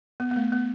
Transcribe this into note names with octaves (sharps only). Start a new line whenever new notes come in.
B3
B3
A3
B3